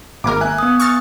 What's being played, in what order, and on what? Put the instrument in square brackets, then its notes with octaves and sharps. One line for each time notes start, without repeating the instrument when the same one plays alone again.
[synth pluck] G#1 A#3 A#4 [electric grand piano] D6
[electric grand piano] E5 G#5 F#6
[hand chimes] B3 D#6
[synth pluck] C#6 F6 A6